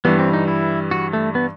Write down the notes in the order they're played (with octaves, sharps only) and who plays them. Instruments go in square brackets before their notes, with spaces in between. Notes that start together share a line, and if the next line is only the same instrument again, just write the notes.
[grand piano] G2 E3 G3 [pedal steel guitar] B3
[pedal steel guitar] C4
D#4
E4
F#4
A3
B3